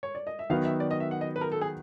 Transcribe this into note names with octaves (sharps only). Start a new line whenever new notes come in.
C#5
D5
D#5
E5
D#3 F#3 B3 F5
E5
D5
D#5
E5
F#5
D#5
B4
A#4
A4
G#4